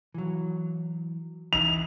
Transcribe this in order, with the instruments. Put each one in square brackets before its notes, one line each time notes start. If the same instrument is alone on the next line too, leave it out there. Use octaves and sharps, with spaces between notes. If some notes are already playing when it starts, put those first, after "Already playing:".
[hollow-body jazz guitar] E3 F#3
[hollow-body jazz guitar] E3 D#4 [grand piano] F7